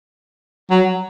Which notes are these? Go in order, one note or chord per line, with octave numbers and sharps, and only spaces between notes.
F#3